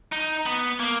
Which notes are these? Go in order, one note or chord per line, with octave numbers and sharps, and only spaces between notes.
D#4
B3
A#3